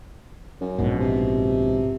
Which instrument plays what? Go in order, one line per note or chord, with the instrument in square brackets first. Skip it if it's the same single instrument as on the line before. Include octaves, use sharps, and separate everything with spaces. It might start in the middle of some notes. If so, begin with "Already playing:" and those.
[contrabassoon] F#2
[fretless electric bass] A#1 G#2 B2
[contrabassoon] C3